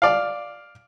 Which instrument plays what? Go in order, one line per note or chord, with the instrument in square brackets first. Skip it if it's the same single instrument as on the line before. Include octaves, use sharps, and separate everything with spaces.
[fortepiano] D5 F5